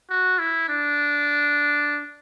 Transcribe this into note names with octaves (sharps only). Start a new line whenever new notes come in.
F#4
E4
D4